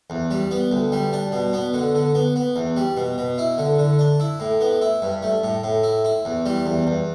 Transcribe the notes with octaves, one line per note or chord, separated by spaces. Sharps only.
E2
G3
B3
D2
G3
D4
B2
B3
D3
D3
B3
B3
E2
G3
B2
B2
E4
D3
D3
D4
E4
A2
B3
E4
G2
A3
A2
A2
E4
E4
E2
G3
E2
E2